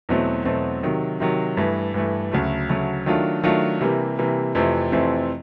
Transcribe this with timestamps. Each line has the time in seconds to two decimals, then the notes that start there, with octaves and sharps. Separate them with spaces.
0.09 E2 B2 F#3 A3 C4
0.45 E2 B2 F#3 A3 C4
0.83 C3 D#3 F#3
1.20 C3 D#3 F#3
1.57 G2 E3 A3
1.94 G2 E3 A3
2.31 D2 C#3 F#3 A3
2.69 D2 C#3 F#3 A3
3.06 D#3 F#3 A3 D4 F4
3.43 D#3 F#3 A3 D4 F4
3.81 C3 E3 G3 A#3
4.18 C3 E3 G3 A#3
4.55 F2 C3 E3 A3 C4
4.92 F2 C3 E3 A3 C4